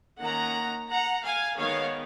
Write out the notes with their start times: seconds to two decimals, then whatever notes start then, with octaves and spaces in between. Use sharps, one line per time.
0.19 D#3 A#3 C#4 F#5 A#5
0.89 F#5 A#5
1.24 F5 G#5
1.58 D#3 G#3 B3 C#5 F5